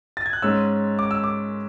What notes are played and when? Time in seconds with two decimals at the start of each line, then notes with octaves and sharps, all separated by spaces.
0.17 A6
0.26 G#6
0.33 F#6
0.42 G#2 G#3 C#4 E6
0.99 D6
1.11 E6
1.24 D6